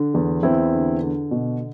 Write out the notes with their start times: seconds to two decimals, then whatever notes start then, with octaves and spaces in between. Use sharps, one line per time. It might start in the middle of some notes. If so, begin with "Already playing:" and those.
Already playing: D3
0.14 E2
0.43 E2 C4 E4
0.72 D3
1.01 D3
1.31 B2